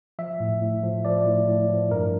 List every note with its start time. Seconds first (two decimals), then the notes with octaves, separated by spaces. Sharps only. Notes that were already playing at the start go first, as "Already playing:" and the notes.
0.19 F3 E5
0.40 A2
0.62 A2
0.83 F3
1.05 F3 D5
1.26 A2
1.48 A2
1.70 F3
1.91 G2 A#4